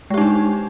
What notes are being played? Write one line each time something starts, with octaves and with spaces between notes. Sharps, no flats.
G#3 D4 D#4 G4